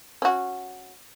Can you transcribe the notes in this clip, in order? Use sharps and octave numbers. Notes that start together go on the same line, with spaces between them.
C#4 F#4